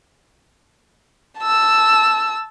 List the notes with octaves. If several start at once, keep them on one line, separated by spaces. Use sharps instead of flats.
A5 E6